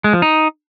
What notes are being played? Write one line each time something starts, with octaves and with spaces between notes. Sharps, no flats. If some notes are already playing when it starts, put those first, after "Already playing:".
G#3
F3
D#4